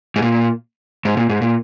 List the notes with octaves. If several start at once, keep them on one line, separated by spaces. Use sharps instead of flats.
G#2
A#2
G#2
A#2
G#2
A#2